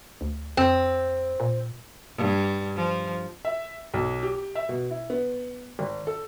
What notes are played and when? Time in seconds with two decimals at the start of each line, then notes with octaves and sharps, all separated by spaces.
0.21 D2
0.57 F2 C4
1.40 A#2
2.17 G2
2.76 F3
3.45 E5
3.94 B1
4.23 G4
4.55 E5
4.69 B2
4.91 E4
5.10 B3
5.79 G#1
6.07 A4